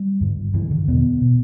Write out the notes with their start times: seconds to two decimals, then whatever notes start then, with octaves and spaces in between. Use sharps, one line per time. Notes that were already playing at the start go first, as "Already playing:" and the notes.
Already playing: G3
0.21 G2 D3
0.54 G2 D3 E3
0.71 D3
0.88 E2 B2 B3
1.21 B2